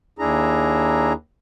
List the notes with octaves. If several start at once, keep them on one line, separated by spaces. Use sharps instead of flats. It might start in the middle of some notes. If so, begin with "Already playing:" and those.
D#2 D4 E4 G#4 A#5